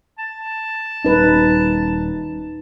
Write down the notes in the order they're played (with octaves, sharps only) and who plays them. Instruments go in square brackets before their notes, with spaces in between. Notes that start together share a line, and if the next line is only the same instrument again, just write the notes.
[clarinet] A5
[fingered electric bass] D#1 G3 C#4 [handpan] D#4 B4